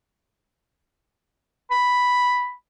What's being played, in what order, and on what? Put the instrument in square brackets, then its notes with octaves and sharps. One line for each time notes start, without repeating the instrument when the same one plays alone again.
[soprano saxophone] B5